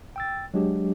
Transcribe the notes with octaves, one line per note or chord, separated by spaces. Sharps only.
G5 E6 A6
F#3 G#3 D4 G4